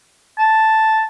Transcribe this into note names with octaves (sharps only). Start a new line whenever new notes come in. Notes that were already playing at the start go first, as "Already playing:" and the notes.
A5